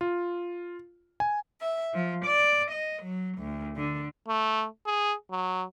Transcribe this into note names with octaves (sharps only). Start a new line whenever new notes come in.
F4
G#5
E5
F3
D5
D#5
F#3
D2
D3
A3
G#4
F#3